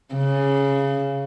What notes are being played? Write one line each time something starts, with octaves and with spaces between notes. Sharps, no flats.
C#3